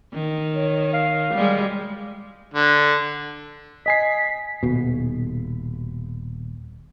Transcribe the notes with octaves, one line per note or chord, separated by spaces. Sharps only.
D#3
C#5
F5
G3 G#3
D3
D#5 G#5 B6 C7
D#1 B2